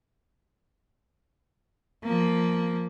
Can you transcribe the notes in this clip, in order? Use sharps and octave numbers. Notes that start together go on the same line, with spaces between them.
F3 A#3